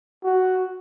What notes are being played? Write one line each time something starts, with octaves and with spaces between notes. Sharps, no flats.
F#4